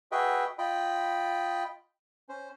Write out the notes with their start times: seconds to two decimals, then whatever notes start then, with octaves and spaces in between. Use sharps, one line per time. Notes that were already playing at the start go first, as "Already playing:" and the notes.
0.12 F#4 G#4 B4 D#5 E5 G5
0.59 F4 D#5 G5 B5
2.29 C#4 C5